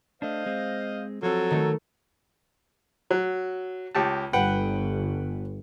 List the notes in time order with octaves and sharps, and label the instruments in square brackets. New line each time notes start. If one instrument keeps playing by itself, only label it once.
[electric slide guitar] A3 D4 [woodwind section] C5 D#5 F5
[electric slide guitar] G#3 C4
[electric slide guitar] F3 C4 [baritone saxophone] F#3 [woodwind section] A4
[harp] D#3 A3
[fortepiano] F#3
C#2 G4 A5
[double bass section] G1 [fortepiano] B4 F#5 G5